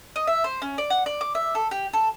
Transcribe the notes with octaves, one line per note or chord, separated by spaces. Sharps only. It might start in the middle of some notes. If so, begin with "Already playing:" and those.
D#5
E5
C5
C#4
D5
F#5
D5
D6
E5
A4
G4
A4